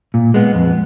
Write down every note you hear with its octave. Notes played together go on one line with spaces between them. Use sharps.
A#2
G#3 B3
F2